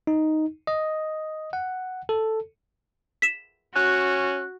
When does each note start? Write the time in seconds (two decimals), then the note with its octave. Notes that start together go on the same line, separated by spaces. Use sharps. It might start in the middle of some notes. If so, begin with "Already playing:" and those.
0.07 D#4
0.67 D#5
1.53 F#5
2.09 A4
3.22 B6 E7
3.76 C#4 F#4 F#6